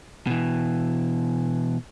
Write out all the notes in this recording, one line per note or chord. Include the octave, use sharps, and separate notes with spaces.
B2 E3